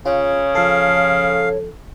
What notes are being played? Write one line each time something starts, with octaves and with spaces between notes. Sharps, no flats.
C#3 F4 C#5
F3 A4 F5